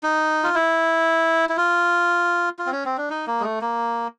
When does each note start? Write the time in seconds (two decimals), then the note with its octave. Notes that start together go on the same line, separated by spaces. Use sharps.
0.03 D#4
0.43 F4
0.55 E4
1.49 E4
1.57 F4
2.59 F4
2.66 C4
2.72 C#4
2.85 C4
2.98 D4
3.10 D#4
3.27 A#3
3.40 G#3
3.44 A3
3.61 A#3